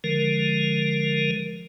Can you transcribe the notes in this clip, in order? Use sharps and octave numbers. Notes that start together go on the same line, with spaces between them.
D3 F3 G#3 A#4